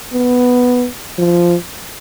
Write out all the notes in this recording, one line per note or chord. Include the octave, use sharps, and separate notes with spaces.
B3
F3